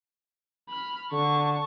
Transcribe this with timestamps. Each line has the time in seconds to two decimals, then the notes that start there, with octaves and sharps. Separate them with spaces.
0.69 B5 F6
1.12 D3 A5 C#6